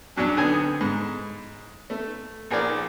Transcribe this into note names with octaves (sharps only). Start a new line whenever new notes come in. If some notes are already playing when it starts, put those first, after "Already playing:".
E2 F#3 C#4 D4
D3 B3 C4 G#5 D#6
G#2
A3
A#1 G#4 A#4 D5